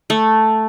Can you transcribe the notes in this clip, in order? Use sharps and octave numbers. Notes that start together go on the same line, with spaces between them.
A3